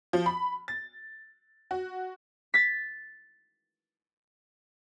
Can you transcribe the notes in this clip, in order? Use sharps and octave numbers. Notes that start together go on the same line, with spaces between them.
F3
B5
A6
F#4
A6 B6